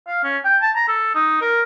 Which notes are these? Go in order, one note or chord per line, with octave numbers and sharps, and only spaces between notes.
F5
C#4
G5
A5
A#5
A4
D#4
A#4